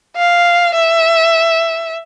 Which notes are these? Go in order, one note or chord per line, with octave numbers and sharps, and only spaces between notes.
F5
E5